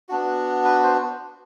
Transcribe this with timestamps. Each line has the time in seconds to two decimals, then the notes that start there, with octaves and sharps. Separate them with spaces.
0.09 B3 D4 F#4
0.65 B4
0.83 C5